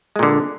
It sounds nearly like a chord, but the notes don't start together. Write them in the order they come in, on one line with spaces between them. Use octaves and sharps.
G#3 A#2 D3